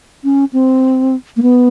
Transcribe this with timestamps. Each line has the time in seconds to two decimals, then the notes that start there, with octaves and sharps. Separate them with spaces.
0.24 C#4
0.53 C4
1.37 A#3
1.42 B3